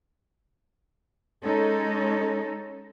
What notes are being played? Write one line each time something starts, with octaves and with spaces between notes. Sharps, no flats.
G#3 C#4 D#4 A4